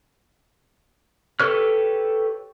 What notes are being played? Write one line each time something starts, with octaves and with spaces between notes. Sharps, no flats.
G4 A4 B4 C#5 F6